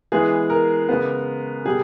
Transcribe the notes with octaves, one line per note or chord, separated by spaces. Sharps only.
E3 G#3 B3 G#4
A#4
C#3 G#3 B3
B2 G3 G#4